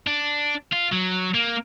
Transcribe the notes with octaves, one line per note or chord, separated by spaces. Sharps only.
D4
F4
F#3
A#3